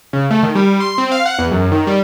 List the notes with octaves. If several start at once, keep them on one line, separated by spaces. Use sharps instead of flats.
C#3
A3
D#3
G3
C6
C4
F5
F#5
E2
F#2
D#3
G3